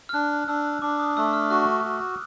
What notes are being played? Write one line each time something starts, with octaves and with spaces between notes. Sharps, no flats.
F6
D4 F#6
D4 E6
D4 D6
D#6
A3 E6
F6
F#4 F#6
F#4